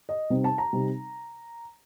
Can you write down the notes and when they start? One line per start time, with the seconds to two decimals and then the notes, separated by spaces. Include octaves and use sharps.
0.09 D#5
0.30 C3 G3 C4 D#4
0.44 A5
0.58 A#5
0.73 C3 G3 C4 D#4